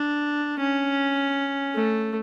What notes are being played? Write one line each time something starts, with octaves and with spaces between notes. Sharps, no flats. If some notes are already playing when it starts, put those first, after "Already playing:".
Already playing: D4
C#4
A3